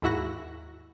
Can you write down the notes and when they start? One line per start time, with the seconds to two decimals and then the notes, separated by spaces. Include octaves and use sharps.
0.02 D#2 G#2 E4 F#4 F#6 A#6